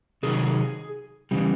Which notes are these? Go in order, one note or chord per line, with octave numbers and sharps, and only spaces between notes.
C3 D#3 F#3 G#4
C#3 E3 G3